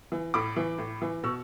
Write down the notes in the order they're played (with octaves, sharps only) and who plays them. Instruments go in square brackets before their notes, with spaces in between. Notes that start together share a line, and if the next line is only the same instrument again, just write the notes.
[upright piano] E3
A2 B5 D6
E3
A2
E3
B2 C#6 E6